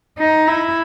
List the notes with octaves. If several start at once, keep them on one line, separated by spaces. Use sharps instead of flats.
D#4
E4